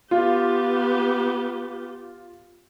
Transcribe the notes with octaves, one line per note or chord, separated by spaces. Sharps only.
B3 F4 G4